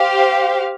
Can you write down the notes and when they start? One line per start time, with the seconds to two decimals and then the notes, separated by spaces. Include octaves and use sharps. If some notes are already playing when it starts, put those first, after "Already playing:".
Already playing: G4 C5 F5